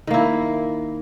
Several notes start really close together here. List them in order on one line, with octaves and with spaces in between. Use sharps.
D#3 A#3 E4